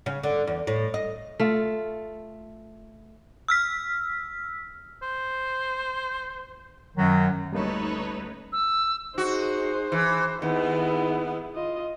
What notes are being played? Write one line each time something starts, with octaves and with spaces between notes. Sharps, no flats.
C#3
D3
E2
A2
D#5
A3 F4
E6 F6 B6
C5
F#2 D#3 F#3
D2 G3 A#3 C#4 D#4 A4 B4 C#5
E6
D#4 F#4 G#4 C5
E3
D#2 B3 E4 G#4
F4 D#5